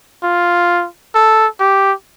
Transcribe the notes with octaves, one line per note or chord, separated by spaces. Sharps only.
F4
A4
G4